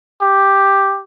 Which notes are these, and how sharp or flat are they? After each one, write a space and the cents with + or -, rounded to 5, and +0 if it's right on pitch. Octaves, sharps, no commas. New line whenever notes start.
G4 +0